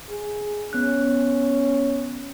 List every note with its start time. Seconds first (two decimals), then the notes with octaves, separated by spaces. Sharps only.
0.10 G#4
0.73 B3 C#4 F#6